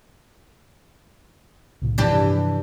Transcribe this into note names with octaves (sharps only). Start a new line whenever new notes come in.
C2 A2 C#3
G2 C3 E3 F3 D4 G4